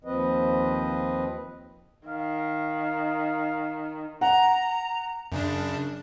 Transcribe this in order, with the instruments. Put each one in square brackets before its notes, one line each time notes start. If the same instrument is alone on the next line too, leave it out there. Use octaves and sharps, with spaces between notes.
[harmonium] D#2 F3 C4 B4 D#5
[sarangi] D#3 [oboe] F5
[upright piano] F#5 [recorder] A#5
[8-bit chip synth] F#2 C#3 D4